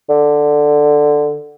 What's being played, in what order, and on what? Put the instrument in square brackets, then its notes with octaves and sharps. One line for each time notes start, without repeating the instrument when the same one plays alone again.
[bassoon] D3